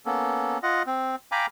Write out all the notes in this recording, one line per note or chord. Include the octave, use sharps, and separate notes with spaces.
A#3 B3 C#4 A4
F4 D#5 F#5
C4
F5 G5 G#5 A#5 B5 D6